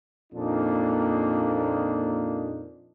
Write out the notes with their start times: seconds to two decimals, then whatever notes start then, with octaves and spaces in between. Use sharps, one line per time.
0.33 F2 A#2 A#3 D4 D#4